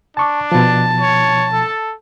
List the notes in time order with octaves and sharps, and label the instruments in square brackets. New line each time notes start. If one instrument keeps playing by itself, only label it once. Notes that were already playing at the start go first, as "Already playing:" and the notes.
[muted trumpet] D4 [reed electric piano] A5 C#6 D6
[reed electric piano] B2 F3 [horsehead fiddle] A5
[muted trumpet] C#5
A4